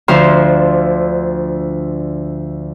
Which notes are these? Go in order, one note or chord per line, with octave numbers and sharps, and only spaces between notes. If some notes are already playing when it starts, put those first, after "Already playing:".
D2 D3 F3 C5 C6 F6